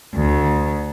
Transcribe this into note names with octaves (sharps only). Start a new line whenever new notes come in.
D2